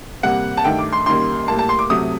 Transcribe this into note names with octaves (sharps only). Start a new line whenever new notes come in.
C3 G3 A#3 F#5
A5
G2 D#3 A3 G5
D6
C6
F#2 D#3 G3 A#3 C6
A2 G3 A#3 A5
A5
C6
D6
C3 F#3 A3 D#6